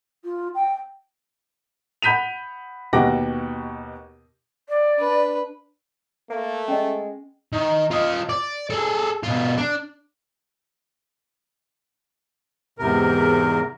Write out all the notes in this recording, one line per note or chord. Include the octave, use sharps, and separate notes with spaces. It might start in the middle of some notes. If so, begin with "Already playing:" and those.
F4
G5
F#5 B5 G6 B6 D#7 F7
D#2 B2 G4 F#5 D6 A#6
D5
D4 B4
A3 A#3
G#3 C#4 D#5
D#3
F4 D#5
D5
G#4 A4
B2 F4
D4
E2 G#2 C3 A#4